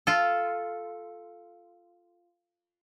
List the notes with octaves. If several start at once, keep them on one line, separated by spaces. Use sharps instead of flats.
F4 A4